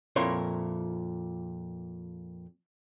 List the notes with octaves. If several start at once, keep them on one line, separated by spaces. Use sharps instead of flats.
F2 A#2 E4 A#4 C#5 C6